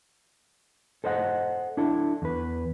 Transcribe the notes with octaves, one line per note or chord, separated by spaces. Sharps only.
A4 C5 D#5 F#5
D4 E4 A4
E2 B4